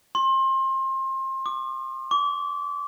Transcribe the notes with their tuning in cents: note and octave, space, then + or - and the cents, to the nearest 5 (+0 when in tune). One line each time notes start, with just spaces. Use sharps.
C6 +30
D6 +25
D6 -35